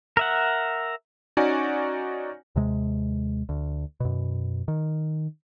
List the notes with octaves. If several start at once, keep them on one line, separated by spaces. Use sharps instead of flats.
A#4 E5 F#5
C#4 D#4 F#4 D5 G#5
D#2 C3 G#3
D2
F#2 B2
D#3